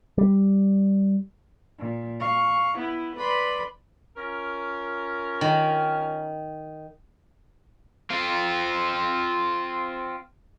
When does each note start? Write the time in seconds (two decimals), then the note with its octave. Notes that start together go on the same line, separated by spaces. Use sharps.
0.18 G3
1.80 A#2
2.20 F5 C#6
2.78 B3 E4
3.16 B4 D5 B5 C6
4.17 C#4 F4 A#4
5.41 D#3
8.11 C4 F4